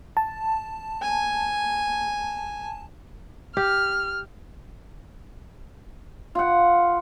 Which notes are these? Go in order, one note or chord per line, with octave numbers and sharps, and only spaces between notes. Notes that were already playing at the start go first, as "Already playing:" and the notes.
A5
G#5
G4 F6
F4 F#5